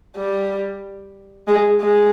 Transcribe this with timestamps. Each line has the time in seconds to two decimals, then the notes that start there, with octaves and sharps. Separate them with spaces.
0.17 G3
1.48 G#3
1.81 G#3